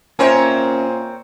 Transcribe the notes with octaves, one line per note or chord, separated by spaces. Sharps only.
A#2 C4 C#4 A#4 C5 C#5 E5 G#5